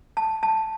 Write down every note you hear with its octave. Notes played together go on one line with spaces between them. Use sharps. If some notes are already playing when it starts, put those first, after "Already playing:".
A5
A5